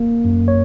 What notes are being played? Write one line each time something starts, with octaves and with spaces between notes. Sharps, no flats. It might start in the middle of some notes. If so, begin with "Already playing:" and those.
Already playing: A#3
F#2
C#5